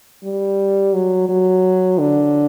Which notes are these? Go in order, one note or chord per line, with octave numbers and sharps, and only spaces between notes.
G3
F#3
F#3
D3